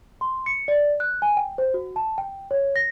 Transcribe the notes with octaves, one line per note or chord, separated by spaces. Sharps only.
C6
C#7
D5
F#6
G#5
G5
C5
F#4
A5
G5
C#5
A#6